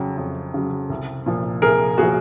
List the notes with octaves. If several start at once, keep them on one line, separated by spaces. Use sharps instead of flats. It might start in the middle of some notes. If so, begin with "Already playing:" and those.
Already playing: F2 C#3 F#3
F2
C#3 F#3
C2
A#2 F3
C2 G#4 A#4
A#2 F3 F#4 G#4